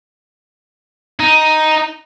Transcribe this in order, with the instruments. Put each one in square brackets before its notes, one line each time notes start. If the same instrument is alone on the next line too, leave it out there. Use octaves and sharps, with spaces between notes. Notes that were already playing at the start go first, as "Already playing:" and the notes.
[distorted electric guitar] D#4